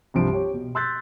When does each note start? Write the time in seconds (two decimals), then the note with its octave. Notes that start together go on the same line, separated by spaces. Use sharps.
0.14 C2 G2 F3 D7
0.33 G4 C#5
0.53 B2
0.75 C6 E6 F#6 G6 A6 B6